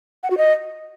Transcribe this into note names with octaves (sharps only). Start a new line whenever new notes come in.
F#5
F#4
D#5